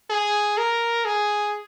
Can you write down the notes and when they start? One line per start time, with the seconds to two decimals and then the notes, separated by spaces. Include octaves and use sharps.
0.10 G#4
0.58 A#4
1.05 G#4